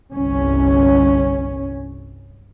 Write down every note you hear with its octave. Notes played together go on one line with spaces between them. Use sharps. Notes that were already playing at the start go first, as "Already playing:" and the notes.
G1 C2 C#4